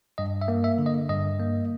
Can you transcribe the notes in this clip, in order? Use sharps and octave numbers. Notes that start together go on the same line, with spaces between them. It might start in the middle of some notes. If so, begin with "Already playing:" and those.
G2 D#5
E5
A#3
E5
D3
D#5
G2 D#5
A#3